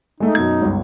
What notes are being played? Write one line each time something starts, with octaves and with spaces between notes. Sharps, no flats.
G#3 A3 D#4 E5
F#2 B2 G#6
G1 C#2